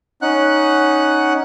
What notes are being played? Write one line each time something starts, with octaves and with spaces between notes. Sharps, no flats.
C#4 D#4 F#5 F#6